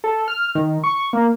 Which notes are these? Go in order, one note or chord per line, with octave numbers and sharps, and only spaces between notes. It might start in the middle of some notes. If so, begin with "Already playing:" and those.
A4
F6
D#3
C#6
A#3